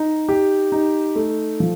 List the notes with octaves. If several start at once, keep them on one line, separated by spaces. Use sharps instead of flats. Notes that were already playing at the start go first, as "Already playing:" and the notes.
Already playing: D#4
G4
D#4
A3
F3